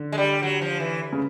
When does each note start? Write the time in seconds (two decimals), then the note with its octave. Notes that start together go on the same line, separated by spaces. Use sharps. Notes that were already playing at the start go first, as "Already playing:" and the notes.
Already playing: D3
0.12 G#3
0.18 G3
0.43 F#3
0.62 F3
0.80 E3
1.12 C#3